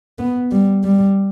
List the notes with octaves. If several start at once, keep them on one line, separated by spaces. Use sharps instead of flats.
B3
G3
G3